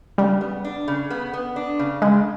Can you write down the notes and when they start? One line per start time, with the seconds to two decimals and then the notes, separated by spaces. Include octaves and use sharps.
0.18 C#3 G3
0.41 B3
0.64 D4
0.88 C#3
1.10 B3
1.33 B3
1.56 D4
1.79 C#3
2.02 C#3 G#3